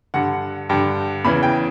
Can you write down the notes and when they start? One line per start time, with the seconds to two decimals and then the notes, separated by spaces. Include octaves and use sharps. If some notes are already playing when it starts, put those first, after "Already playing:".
0.14 G2 D3 F#5
0.70 G2 D3 G5
1.24 E2 C#3 E3 B5
1.43 G5